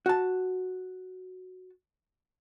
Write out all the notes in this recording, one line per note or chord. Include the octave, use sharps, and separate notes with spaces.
F#4 A5